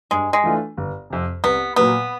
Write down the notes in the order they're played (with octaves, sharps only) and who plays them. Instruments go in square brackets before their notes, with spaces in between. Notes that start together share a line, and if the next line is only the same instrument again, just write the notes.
[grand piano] G2 [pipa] G#3
[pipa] G#3
[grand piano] E3 A3 D4 F4
G1
F2 C3
[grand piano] C2 [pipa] B3
[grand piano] A#2 F#3 A#3 [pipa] B3